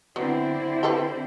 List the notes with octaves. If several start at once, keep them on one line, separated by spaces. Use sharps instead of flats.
D3 F#3 B3 C4 E4
G4 A4 B4